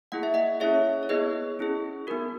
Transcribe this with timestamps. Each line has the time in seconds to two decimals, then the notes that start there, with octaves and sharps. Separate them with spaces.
0.12 A#3 E4 G#4 F#5
0.23 E5
0.34 D#5 F#5
0.60 C#4 E4 G#4 C#5 E5
1.03 C#5
1.09 B3 E4 G#4 B4 D#5
1.59 C#4 E4 G#4
2.07 B3 D#4 F#4 A#4